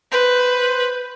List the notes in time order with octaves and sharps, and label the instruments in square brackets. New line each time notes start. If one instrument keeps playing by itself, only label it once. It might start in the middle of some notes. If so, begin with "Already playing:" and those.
[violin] B4 [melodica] C5